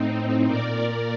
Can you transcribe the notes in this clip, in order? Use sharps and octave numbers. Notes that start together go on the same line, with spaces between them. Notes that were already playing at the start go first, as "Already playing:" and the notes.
Already playing: A2 C4 D#4
A#2 A#4 D5
A#4 D5